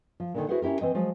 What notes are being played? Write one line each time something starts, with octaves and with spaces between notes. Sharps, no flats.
F3
A#2 D3 D#3
E4 F#4 G#4 B4 C5 F#5
C#4 E4 G4 A#4
E3 C4 D#5
F3 F#3 G#3